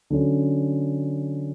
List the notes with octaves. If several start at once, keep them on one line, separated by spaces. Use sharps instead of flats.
D3 F#3 C#4